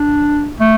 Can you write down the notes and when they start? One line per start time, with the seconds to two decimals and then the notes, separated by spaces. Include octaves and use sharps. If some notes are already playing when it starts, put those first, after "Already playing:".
Already playing: D4
0.60 A3